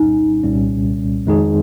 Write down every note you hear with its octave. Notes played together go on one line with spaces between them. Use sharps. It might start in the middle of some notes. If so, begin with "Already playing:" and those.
Already playing: C2 A#2 G3 C#4 D#4
C2 A#2 G3 C#4
F2 D#3 G#3 D#4 G#4